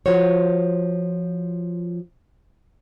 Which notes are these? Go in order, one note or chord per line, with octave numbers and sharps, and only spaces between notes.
F3 F4 F#4 C5 C#5